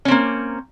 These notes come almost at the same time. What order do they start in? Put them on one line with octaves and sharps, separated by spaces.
C#4 C4 A#3